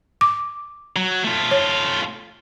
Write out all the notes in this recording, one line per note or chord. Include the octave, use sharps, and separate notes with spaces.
D6
F#3
A3 F4
C#5